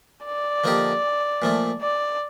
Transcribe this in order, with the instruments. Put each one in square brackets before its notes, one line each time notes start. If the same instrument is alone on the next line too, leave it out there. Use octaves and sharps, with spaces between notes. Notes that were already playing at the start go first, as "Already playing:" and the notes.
[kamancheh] D5
[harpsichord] D3 F3 A#3 D#4 G4
A#2 F3 A3
[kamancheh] D5